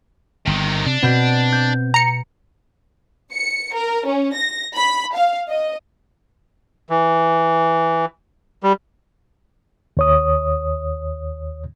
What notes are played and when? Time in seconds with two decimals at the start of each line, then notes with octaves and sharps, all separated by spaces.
0.47 G1 C3 D#3
0.86 C3 D4
1.02 B2 C4 G6 B6
1.52 G6
1.94 A#5 C#7
3.32 C#7
3.73 A#4
4.06 C#4
4.35 A#6
4.75 B5
5.15 F5
5.49 D#5
6.90 E3
8.63 G3
9.97 D#2 C#5 D#6